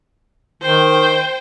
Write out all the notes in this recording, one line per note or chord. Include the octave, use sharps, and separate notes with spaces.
D#3 C5 G5